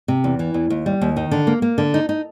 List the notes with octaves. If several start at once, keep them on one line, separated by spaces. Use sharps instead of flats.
C3
E2
E3
E2
D#2
G3
D#2
D#3
D3
A#3
A#3
D3
D#4
D#4